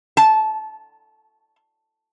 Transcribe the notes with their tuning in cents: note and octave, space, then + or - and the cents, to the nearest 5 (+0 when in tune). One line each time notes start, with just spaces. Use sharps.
A5 -20